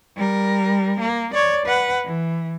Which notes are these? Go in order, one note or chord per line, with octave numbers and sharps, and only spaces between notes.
G3 A#4
A#3
C#5 D5
B4 F#5
E3